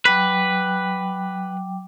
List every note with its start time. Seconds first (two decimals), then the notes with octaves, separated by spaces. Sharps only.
0.05 F#3 B4 G5 D6